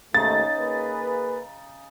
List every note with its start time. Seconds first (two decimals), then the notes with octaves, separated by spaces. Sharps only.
0.14 D#2 G#2 C#3 A3 D#4 A6
0.58 A#3 G#4 B4